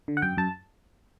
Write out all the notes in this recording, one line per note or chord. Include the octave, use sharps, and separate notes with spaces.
D3
F#5
F#2 G5
F#2 A5